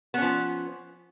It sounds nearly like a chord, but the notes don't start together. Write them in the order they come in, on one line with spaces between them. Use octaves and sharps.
B3 C#4 F3